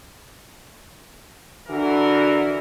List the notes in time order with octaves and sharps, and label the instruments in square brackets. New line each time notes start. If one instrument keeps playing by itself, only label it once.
[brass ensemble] D3 E3 F#4 A#4